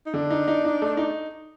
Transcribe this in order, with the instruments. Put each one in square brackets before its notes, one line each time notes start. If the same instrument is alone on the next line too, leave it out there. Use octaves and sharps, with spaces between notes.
[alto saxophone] D#4
[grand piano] D3 [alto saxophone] D4
[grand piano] D#4
D#4
D#4
A3
D#4